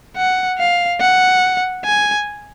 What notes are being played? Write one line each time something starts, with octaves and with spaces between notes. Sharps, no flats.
F#5
F5
F#5
G#5